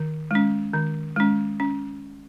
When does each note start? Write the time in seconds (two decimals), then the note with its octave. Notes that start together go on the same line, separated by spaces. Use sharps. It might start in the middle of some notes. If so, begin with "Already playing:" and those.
Already playing: D#3
0.31 G#3 C#4
0.74 D#3
1.16 G#3 C#4
1.60 C#4